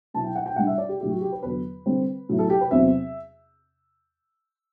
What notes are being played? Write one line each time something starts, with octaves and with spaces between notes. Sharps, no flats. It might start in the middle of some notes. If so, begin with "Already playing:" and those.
B2 F#3 B3 E4 A5
G5
F#5
G5
A2 G3 D4 F#5
E5
D5
G4
A2 F#3 A3 E4 G4
F#4
G4
B4
E2 D3 F#3 B3 B4
D3 G3 C4
A2 F#3 B3 E4
A4
G4
B4
E2 C3 F#3 C4 E5